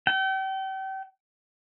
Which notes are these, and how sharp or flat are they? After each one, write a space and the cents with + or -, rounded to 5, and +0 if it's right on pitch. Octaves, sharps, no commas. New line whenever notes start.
G5 -35